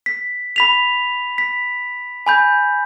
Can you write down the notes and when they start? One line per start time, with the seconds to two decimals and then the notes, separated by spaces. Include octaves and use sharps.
0.06 B6
0.56 B5 B6 F7
1.38 B6
2.27 G#5 B5 G6